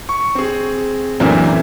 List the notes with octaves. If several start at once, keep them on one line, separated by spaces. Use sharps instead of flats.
C#6
C4 G#4
F#2 A#2 E3 A3 C4 D4